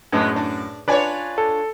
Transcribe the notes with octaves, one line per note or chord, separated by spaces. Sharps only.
F#2 A2 G#3 B3 D4
D4
D4 F4 B4 C#5 D5 G#5
A4